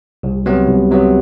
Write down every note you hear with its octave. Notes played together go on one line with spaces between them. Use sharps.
C2
C3 F#3 B3
C2
C3 F#3 B3